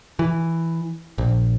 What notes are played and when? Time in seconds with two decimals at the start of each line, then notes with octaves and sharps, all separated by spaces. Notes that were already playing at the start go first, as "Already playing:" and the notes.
0.19 E3
1.18 A#1